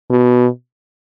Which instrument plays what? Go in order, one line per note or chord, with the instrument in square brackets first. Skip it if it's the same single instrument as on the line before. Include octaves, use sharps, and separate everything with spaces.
[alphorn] B2